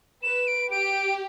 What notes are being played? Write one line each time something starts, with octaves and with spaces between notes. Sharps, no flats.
B4 E7
D7
G4 D7